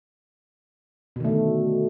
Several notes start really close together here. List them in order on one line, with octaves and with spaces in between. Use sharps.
B2 D#3 A3 D3